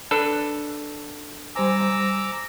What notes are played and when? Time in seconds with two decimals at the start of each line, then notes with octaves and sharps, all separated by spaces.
0.11 D4 A4 B4
1.55 G3 C5 G#5 A#5 D6 E6